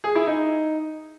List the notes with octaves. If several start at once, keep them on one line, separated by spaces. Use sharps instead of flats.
G#4
E4
D#4